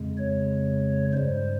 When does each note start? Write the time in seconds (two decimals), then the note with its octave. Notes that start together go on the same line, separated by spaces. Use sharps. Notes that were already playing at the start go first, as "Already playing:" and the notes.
Already playing: F2 C#3 G#3
0.17 C#5
1.13 G2 G3 C5